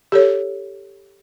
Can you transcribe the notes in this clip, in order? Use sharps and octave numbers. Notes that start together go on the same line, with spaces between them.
G4 A4 C#5